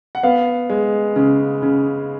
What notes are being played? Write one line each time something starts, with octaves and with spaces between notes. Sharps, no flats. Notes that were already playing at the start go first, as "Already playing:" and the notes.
F#5
B3 F5
G#3
C#3
C#3